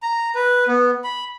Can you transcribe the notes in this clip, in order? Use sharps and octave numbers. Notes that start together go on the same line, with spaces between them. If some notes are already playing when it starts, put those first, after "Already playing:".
A#5
B4
B3
B5